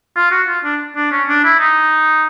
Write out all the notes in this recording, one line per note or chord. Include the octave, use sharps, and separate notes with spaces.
F4
F#4
F4
D4
D4
C#4
D4
E4
D#4